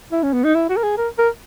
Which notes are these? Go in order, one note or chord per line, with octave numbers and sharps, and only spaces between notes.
E4
C#4
B3
D#4
E4
F#4
A#4
G#4
A#4
A#4